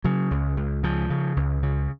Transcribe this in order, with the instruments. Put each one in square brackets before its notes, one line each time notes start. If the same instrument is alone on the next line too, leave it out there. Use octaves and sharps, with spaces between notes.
[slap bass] C#3 F#3
C#2
C#2
C#3 F3
C#3
C#2
C#3